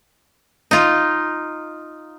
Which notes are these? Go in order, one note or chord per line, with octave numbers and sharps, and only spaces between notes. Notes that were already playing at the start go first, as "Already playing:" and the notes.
D#4 F4